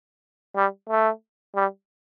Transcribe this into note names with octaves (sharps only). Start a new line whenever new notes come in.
G3
A3
G3